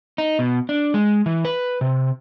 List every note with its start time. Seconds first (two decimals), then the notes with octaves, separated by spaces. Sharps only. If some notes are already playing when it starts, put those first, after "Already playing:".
0.18 D#4
0.39 B2
0.69 D4
0.94 G#3
1.26 E3
1.45 B4
1.81 C3